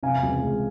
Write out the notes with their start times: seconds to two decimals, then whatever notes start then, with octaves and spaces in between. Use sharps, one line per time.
0.03 C3 F5 G#5
0.23 C#2
0.42 G#3